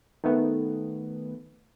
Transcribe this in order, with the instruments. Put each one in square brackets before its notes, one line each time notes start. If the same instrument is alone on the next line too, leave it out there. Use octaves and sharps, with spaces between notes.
[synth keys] D#3 A3 B3